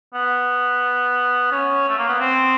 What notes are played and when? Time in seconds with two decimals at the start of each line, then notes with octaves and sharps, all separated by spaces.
0.14 B3
1.52 C#4
1.88 A3
1.98 A#3
2.09 B3
2.20 C4